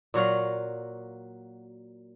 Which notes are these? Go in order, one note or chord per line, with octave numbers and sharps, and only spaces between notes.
A#2 F#3 F#4 F5